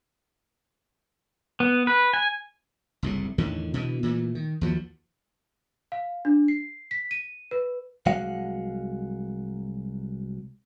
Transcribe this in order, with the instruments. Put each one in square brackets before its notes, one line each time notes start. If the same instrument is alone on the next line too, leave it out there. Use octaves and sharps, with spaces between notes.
[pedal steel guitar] B3
B4
G#5
[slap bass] F#1 C2 A2
E2 A2 D3 D#3
B2 D3 E3
A#2 E3 F#3 A3
D#3
D#2 F3 F#3
[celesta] F5
D4
C7
B6
D#7
B4
[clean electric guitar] C2 F#3 G#3 F5 F#5